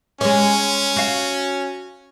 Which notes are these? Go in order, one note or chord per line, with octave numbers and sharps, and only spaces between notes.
G#3 C#4 C#5
F#4 F5